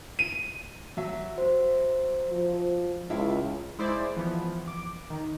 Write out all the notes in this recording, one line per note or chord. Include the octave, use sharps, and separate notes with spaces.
D#7
F#3 E5
F#4 C5
F3
C#2 E4 F4 E5
G#3 E4 C5 D5
E3 F3 B3
D6
D#3